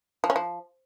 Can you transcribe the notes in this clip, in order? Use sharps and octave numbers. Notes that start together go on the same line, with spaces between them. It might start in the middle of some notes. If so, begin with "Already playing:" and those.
F3
C#4
F3